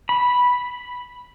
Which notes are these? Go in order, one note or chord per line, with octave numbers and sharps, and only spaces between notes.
B5